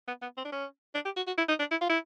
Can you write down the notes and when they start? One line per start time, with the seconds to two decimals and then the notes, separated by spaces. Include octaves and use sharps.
0.08 B3
0.22 B3
0.37 C4
0.45 D4
0.52 C#4
0.95 D4
1.05 G4
1.17 F#4
1.27 F#4
1.38 E4
1.49 D#4
1.59 D4
1.71 E4
1.81 F4
1.89 E4